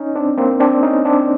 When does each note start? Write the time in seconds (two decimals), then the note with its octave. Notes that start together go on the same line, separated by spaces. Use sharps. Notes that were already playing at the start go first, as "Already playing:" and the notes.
Already playing: C#4 D#4
0.15 C4 D4
0.37 A#3 C4
0.60 C4 D4
0.83 C#4 D#4
1.05 C4 D4